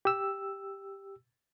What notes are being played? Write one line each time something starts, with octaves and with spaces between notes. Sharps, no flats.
G4 E6